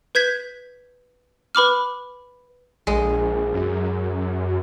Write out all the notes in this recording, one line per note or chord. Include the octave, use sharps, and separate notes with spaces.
B4 G6 G#6 B6
B4 B5 D6 F6
A#1 G#3
F#2